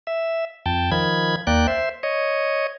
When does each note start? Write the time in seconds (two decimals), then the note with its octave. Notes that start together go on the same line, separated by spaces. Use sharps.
0.07 E5
0.66 F2 G5 A5
0.91 D#3 F3 B5 G#6
1.47 D#2 A#3 D5 G5 F#6
1.68 C5 E5
2.03 C#5 D#5